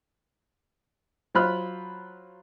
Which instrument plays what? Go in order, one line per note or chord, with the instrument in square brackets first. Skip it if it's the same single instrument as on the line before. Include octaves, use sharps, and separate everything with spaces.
[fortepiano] F#3 F4 C5 B5 F6 F#6